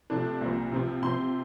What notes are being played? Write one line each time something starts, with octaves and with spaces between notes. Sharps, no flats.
C3 F3 A3 D4
C2 A#2 F3 C4
C3 F3 C4
C3 F3 C4 C6